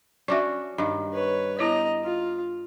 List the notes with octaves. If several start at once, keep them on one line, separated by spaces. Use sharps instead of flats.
C#4 D4 F#4 D5 E5
G2 D#3 D#5
B4 C#5
B3 E4 C#5 D#5 A#5
F4